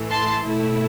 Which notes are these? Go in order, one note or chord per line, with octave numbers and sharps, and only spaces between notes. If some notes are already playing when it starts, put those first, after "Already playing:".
Already playing: A2 E3 A3
A5 C6
B2 A3 E4